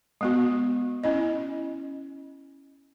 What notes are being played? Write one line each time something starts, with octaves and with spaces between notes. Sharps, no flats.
G#3 B3 F#4
C#4 E4 D#5